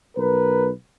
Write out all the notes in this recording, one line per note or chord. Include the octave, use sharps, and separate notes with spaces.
B1 A#4 B4